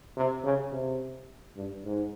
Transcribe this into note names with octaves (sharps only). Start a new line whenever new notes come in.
C3
C#3
C3
G2
G#2